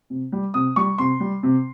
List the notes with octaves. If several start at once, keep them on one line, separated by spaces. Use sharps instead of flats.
C3
G3
C3 D#6
G3 C#6
C3 C6
G3
C3